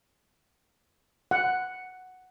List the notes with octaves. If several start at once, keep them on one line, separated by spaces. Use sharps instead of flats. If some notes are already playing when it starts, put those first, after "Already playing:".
F#5